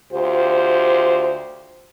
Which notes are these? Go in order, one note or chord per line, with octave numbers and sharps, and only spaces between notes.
D2 F4 G4 C5